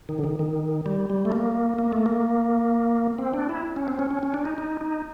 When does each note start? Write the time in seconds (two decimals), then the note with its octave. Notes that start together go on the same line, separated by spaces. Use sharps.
0.09 D#3
0.18 D3
0.24 D#3
0.39 D#3
0.86 G3
1.10 G3
1.25 A3
1.32 A#3
1.79 A#3
1.93 A3
2.06 A#3
3.18 C4
3.33 D4
3.49 E4
3.76 C#4
3.88 C4
3.99 C#4
4.11 C#4
4.23 C#4
4.34 D4
4.45 D#4
4.58 D#4
4.81 D#4